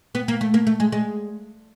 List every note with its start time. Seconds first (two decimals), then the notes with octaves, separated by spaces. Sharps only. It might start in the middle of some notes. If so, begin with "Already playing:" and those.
0.15 B3
0.28 A#3
0.41 A3
0.54 A#3
0.67 A3
0.80 G#3
0.92 G#3